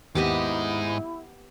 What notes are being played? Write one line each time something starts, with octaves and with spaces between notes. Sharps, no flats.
D#2 G#2 B3 E4 G4 D#5 D6